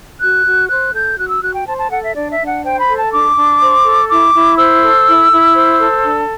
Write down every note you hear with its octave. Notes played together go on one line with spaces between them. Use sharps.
F#4 F#6
F#4
C5 F#6
A4 G6
F#4 F#6
E6
F#4 F#6
G5
C5 A5
A5
A4 F#5
E5
D4 D5
E5
D4
F#5
C5 G5
B5
A4
A5
D4 D6
D4
C5
A4
E4 D6
E4
C5 E6
A4
E4
E4
C5
A4
D4